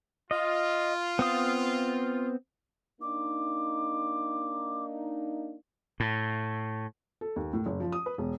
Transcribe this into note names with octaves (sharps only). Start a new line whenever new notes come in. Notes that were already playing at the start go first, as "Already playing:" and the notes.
F4 D#5
B3 C4 D#6
A#3 D4 D#4 D6
A2
A4
D#2
A2
F#1
F3
D#6
B4
E1